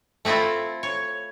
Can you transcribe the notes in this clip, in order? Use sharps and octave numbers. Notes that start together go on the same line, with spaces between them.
A3 C4 E4 F4 C5
C#5